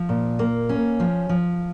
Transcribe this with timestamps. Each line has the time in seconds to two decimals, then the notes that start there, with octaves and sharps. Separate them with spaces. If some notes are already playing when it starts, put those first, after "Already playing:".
Already playing: F3
0.09 A#2
0.39 A#3
0.69 C#4
1.00 F3
1.29 F3